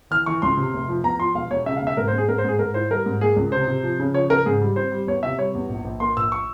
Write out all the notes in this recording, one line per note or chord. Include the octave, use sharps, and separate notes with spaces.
E3 F6
E3 C#6
C#2 C6
C3
F1
F3
E2 A#5
F3 C6
E1 F5
E1 C#5
C#3 E5
F5
E1
E5
G#2 A#4
C5
G#2 G#4
G#2 A#4
C5
G#2 G#4
G#2 A#4
E4 C5
G3 A#4
G#2
A#3 G#4
C#2
C3 C5
C3
F3
C#3
F3 C#5
C#3 A#4
G#2 G#4
G3
C4 C5
G3
E2 C#5
C3 E5
G3 C#5
E2
A#1
A#1
A#3 C6
A#1 E6
C#6